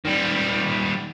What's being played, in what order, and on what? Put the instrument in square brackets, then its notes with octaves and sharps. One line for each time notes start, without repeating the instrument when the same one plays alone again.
[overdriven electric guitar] D#3 G3